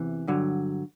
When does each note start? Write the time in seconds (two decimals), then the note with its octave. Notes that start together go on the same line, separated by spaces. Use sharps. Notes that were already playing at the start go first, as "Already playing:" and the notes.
Already playing: E2 C3 E3
0.28 G2 D3 F#3